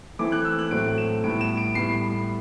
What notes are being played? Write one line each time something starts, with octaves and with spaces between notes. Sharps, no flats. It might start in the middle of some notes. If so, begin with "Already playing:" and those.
E3 A3 C4 D6
F#6
E6
F#6
A2 F#3 A3 C4 D7
E7
A2 G3 B3 D7
E7
D7
A2 G3 B3 C7